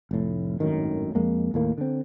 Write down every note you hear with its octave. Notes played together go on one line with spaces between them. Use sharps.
F1 A2
G#1 F#2 A2 D#3
F2 G#3 A#3
D#2 A2 A#3
D3 C4